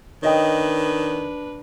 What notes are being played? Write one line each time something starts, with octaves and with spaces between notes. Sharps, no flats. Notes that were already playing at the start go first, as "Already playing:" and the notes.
D#3 D4 B4 C#5 D#5 G5